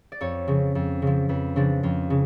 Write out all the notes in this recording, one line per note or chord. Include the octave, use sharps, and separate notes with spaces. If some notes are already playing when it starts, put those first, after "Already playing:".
D5
F2 C#5
C#3 F3
F2
C#3 F3
F2 B4
C#3 F3 D4
F2 F4
C#3